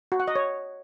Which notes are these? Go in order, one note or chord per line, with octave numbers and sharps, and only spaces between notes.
F#4
F#5
D#5
C#5